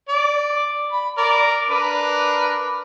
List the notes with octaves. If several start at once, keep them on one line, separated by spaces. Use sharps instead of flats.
D5
B5
A#4 D5
D4 A#4 B4